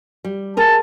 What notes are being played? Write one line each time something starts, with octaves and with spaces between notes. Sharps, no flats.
G3
G#4 A#4 A5